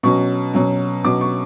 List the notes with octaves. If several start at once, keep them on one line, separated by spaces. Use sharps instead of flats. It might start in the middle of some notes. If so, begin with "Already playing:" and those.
B2 F#3 C#4 C#6
B2 F#3 C#4
B2 F#3 C#4 D6
C#6